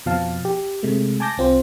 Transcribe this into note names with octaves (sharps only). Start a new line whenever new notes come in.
F2 B2 F3 F5 A5
G4
C3 G#3 A3
G#5 A5 D6 G6 A#6
C2 C4 F4 C5